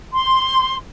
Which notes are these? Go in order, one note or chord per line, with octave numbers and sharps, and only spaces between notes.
C6